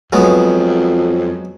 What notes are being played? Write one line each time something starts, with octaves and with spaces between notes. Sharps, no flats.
F2 F#3 G#3 B3